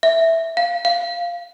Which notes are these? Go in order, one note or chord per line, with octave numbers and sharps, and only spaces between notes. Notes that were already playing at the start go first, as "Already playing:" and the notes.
E5
F5
F5